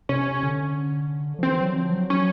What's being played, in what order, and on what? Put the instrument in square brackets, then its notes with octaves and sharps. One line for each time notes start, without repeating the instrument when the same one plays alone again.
[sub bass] C3 [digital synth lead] C#4
[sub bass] D3
F3
[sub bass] E3 [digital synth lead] C4
[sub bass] F#3
F3
F#3
[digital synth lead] C#4